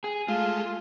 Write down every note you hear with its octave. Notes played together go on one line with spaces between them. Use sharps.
G#4
G#3 A3 F4